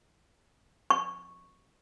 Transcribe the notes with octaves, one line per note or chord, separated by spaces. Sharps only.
C#6